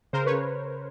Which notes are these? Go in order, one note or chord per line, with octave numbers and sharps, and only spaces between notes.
C#3 A#4 C5
B4 C#5
C#3